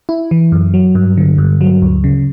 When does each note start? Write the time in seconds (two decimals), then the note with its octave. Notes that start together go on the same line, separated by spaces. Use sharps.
0.09 E4
0.31 E3
0.52 F#2
0.74 F#3
0.95 G2
1.17 D3
1.38 G2
1.61 F#3
1.82 D2
2.04 C#3